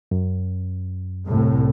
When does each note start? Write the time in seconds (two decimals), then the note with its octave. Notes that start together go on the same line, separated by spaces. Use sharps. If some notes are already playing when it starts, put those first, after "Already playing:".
0.11 F#2
1.27 C2 A2